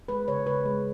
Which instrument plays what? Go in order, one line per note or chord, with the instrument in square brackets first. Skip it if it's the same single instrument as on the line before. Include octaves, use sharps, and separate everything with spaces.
[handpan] G#3 B4
C#3 C#5
C#3 B4
G#3